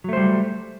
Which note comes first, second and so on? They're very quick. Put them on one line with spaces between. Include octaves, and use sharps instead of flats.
F#3 A3 C5 G3